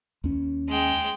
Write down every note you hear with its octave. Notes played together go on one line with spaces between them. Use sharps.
D#2 C#4
G#3 G5